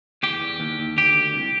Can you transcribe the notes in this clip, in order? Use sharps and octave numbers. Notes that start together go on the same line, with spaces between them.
E2 G4
E2
D#2
D#2
D2 G4
D2
C2